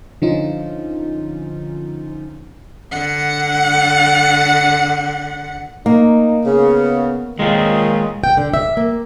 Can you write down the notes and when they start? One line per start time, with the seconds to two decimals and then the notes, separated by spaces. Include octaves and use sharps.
0.22 D3 F3 C#4 D#4 F4
2.92 D3 F#5
5.86 A#3 D#4
6.46 C#3 B3
7.39 F2 A#2 D#3 G#3 F4
8.24 G5
8.37 D3
8.54 E5
8.77 A#3